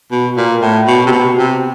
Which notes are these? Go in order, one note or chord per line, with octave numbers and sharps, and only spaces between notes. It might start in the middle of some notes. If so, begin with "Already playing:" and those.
B2
A#2
A2
B2
C3
B2
C3